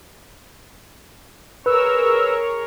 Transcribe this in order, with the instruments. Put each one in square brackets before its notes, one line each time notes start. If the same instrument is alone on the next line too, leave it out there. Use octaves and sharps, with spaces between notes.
[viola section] G#4 A#4 C#5 [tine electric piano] B4 [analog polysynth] E6